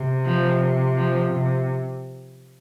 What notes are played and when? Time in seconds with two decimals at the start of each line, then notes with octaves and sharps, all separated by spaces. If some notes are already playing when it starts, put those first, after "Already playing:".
Already playing: C3
0.25 F3
0.96 F3
1.32 C3